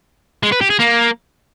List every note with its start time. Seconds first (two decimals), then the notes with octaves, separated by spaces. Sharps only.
0.43 G#3
0.52 B4
0.61 G4
0.70 G#4
0.79 A#3